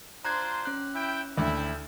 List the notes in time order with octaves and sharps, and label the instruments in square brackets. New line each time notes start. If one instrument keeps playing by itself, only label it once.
[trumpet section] D4 F4 C5 [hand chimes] A#5 F#6 G#6
[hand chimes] C#4 F#6
[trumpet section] E4 G5
[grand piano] D2 [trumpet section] E4 G5